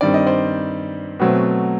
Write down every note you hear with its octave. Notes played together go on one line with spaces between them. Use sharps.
G2 D#3 G3 C4 D5
D#5
C5 D5
B2 F#3 A3 C4